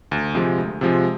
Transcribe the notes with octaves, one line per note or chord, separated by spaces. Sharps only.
D2
C3 F3 G#3
D2
C3 F3 G#3